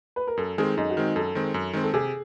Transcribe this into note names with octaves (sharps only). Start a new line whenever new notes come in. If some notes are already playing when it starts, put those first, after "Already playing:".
B4
A#4
F#2 A4
D#3 G#3 C4 G#4
F#2 D#4
F#4
D#3 G#3 C4
F#2 A4
D#3 G#3 C4
F#2
D#3 G#3 C4
A4
C3 G#4